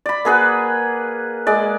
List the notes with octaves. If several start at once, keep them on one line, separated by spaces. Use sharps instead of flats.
D5 B5
A#3 G#4 B4 F#5
G#3 D5